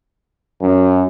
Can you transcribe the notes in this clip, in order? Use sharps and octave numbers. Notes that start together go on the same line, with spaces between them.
F#2